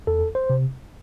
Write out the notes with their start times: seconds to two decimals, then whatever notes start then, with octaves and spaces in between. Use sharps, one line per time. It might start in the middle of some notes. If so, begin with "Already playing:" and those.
0.07 E2 A4
0.35 C5
0.50 C3